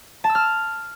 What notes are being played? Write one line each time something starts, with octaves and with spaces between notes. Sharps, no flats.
A5
E6
F6